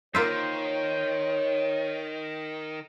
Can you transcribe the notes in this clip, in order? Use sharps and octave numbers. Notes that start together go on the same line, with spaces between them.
D#3 A#3 F4 C5 C#5 E5